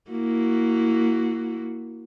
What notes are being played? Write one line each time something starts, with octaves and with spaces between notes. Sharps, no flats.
A#3 E4 F#4